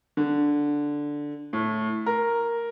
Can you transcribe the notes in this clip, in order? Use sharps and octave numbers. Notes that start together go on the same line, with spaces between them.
D3
A2
A#4